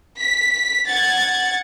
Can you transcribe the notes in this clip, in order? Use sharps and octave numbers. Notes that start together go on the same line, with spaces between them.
B6
F#5 G#6 A6